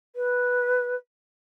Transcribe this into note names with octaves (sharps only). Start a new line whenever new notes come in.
B4